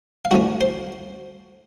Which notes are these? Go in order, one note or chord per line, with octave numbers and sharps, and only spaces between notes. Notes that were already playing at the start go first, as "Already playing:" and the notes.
F5
G2 E3 A3 C#4 F#4 F#5
C5 C6